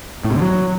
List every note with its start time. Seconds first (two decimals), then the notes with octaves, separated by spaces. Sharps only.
0.24 A2
0.30 C3
0.36 D3
0.42 F#3